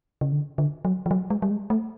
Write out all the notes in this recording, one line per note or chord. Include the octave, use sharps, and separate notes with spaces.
C#3
D3
D3
F#3
F3
F#3
G#3
G3
G#3
A3